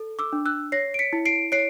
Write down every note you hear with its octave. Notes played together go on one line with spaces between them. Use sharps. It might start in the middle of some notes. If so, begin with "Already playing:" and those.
Already playing: A4
D6 E6
D4
E6 F#6
C#5 A#6 C7
D7
B6 C#7
E4
C7 D7
C#5 C7 D7